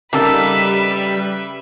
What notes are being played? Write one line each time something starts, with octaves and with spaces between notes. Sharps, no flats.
C#3 G3 A#3 D#4 A4 B4 E5